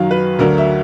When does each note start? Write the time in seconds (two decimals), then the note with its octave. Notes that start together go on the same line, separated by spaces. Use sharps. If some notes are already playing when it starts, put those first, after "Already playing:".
Already playing: F#2 D#3 F#3 F5
0.11 B4
0.38 D2 D3 F#3 A#4
0.58 E5